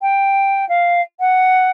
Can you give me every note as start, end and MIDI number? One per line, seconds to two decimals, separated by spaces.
0.01 0.67 79
0.69 1.01 77
1.20 1.70 78